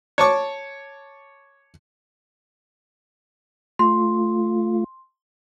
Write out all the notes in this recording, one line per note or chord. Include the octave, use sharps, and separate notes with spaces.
C#5 A5 C#6 D6
A3 F4 C6